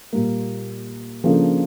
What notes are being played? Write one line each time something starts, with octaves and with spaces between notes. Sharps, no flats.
A#2 G3 A#3
C#3 F3 A#3 D4 A4